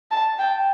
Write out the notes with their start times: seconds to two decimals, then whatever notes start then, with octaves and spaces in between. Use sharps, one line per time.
0.11 A5
0.38 G5